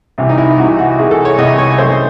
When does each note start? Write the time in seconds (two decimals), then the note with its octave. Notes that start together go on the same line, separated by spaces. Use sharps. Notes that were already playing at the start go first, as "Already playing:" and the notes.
0.18 C2 C3 E3
0.29 D#4
0.38 E4
0.58 C2 C3 E3 F#4
0.79 F#4
0.99 C2 C3 E3 G#4
1.11 A4
1.25 C#5
1.38 C2 C3 E3 D#5
1.58 C#5
1.78 F#2 E3 A3 C5